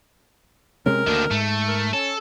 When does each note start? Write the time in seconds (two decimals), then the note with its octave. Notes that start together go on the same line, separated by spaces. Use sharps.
0.86 C3 G#3 C#4 A#4
1.07 D2 D#3 A#3 D4
1.31 G#2 A3
1.68 A#4
1.93 C#4 A4